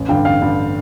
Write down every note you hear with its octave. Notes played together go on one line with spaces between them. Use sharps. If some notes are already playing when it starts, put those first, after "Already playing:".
Already playing: A1
G2 D3 F5 G5
A1 F5 G5
G2 D3